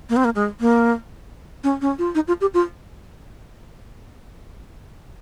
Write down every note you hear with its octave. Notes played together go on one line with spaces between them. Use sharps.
A#3
C4
A#3
G#3
A#3
C#4
C#4
F4
D#4
F4
G4
F4